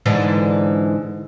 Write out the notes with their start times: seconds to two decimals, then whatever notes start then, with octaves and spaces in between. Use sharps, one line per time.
0.06 G#2 D3 E3